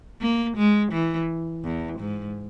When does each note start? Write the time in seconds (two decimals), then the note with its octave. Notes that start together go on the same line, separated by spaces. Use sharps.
0.22 A#3
0.57 G#3
0.92 E3
1.64 E2
2.00 G#2